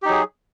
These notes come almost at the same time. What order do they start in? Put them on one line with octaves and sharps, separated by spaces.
G4 D#4 F#3 G#4